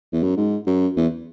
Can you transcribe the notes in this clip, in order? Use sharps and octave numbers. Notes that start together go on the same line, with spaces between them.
E2
F#2
G#2
F#2
E2